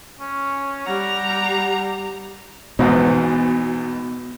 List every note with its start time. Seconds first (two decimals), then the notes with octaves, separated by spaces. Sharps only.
0.20 C#4
0.86 G3 F#5 A#5
2.79 A#1 E2 G#2 B2